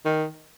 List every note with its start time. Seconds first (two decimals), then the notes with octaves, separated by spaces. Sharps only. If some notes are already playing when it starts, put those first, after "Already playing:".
0.05 D#3